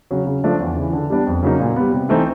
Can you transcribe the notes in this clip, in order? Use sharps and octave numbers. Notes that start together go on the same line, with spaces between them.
C#3 F#3
C#3
F3 A3 D4
E2
C#3 E3
D3
G3 B3 D4
F2
C#3 F#3 A#3 D#4
A#2
G3 B3
C3
E3 A3 C4 D#4